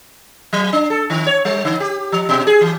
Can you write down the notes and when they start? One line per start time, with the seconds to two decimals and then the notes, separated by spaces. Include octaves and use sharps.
0.53 F#3
0.73 D4
0.90 A4
1.10 D#3
1.27 C#5
1.45 G3
1.65 D3
1.80 G4
2.12 F3
2.29 B2
2.47 G#4
2.61 E3